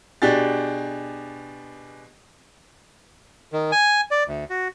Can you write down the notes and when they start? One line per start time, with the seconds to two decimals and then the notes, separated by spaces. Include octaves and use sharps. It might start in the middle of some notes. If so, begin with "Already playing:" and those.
0.22 B2 D4 G4 G#4 A6
3.52 D#3
3.72 G#5
4.11 D5
4.28 D2
4.50 F#4